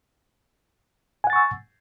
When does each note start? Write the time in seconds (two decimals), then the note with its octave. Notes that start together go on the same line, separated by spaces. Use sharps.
1.24 G#5
1.27 F#5
1.30 A6
1.33 C#6
1.36 E6